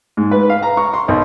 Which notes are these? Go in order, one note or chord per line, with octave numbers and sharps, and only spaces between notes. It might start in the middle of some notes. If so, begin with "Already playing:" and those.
G#2
B4
F5
A#5
C#6
C6
B1